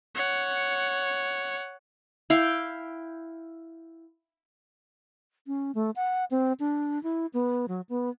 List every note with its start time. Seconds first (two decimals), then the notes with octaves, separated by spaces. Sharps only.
0.15 C#5 F#5
2.30 E4 F5 G5
5.47 C#4
5.75 A3
5.96 F#5
6.31 C4
6.60 D4
7.03 E4
7.33 B3
7.68 F#3
7.89 B3